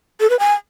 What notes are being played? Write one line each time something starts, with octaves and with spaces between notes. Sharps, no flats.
A4
B4
G#5